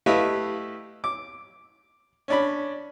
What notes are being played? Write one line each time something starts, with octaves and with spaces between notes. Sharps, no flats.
A3 E4 G4 B4 D#5 F5
D6
C#4 D4 B5